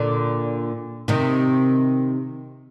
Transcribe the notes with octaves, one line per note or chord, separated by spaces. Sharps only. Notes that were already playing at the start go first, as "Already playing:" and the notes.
Already playing: A#2 D3
C3 D#3